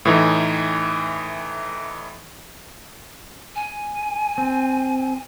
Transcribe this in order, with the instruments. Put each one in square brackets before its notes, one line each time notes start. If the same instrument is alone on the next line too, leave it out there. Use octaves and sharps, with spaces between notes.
[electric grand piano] A2 E3 D#4
[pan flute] G#5
[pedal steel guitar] C4